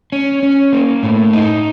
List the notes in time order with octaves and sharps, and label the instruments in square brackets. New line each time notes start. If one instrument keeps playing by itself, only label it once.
[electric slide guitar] C#4
C#4
A#3
A2
D#4